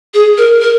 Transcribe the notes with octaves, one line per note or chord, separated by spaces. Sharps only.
G#4
A#4
A#4